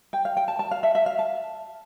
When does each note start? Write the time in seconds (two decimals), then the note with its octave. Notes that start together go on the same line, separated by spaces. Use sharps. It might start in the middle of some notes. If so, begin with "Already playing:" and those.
0.13 G5
0.25 F5
0.37 G5
0.48 A5
0.59 A5
0.71 F5
0.83 E5
0.95 E5
1.06 F5
1.19 A5